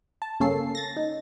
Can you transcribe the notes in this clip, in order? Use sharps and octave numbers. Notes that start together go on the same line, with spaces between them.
A5
G1 C#3 A#3 C#4 A4 C7
A6 A#6
D#4